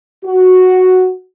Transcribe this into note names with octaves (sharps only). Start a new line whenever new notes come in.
F#4